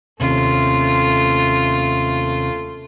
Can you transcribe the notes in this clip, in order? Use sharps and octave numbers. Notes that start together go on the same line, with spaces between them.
D#2 C3 A3 C#4 F4